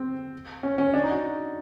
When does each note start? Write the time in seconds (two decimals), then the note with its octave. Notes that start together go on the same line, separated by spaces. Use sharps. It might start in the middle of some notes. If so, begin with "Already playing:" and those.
Already playing: C4
0.63 C#4
0.78 C#4
0.94 D4
1.04 D#4
1.09 F#4